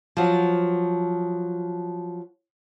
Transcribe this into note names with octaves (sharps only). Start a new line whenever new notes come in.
F3 F#3